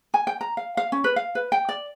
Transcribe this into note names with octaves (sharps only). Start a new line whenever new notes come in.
G#5
G5
A#5
F5
F5
C#4
B4
F5
B4
G5
D5